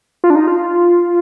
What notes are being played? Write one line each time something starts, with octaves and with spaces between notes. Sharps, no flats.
F4
D4
D#4
F4